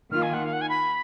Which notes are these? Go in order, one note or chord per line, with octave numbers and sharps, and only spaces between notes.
D#3 A#3 F4 F6
G#5
F#5
F5
F#5
G#5
B5